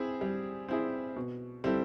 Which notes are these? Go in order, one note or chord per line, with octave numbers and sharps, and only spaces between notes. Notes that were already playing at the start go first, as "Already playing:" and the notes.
Already playing: C4 E4 G#4
G3
C4 E4 G#4
B2
G3 C4 E4 A4